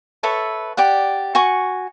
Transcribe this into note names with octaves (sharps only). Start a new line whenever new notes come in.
A4 B4 C#5 E5
G4 D5 F#5
F#4 G#5 C#6